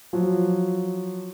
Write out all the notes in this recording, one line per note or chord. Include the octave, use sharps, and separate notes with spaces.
F3 F#3